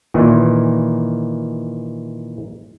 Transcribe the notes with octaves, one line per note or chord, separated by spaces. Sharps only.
A#2 D#3 E3